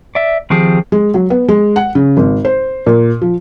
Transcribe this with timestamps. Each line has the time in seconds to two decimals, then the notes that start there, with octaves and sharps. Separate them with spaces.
0.15 D5 E5
0.50 D#3 F3 C4 G4 G#4
0.92 G#3
1.14 F#3
1.30 B3
1.48 G#3
1.76 F#5
1.95 C#3
2.17 G#1
2.45 C5
2.86 A#2
3.22 F3